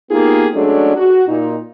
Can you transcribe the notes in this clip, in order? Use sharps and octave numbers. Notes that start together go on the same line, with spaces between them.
A#3 B3 D#4 F4 G4 G#4
F#3 G#3 A3 C#4 D4
F#4
A#2 D#4